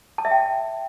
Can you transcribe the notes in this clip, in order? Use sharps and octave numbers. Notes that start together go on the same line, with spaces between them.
A5
E5
G5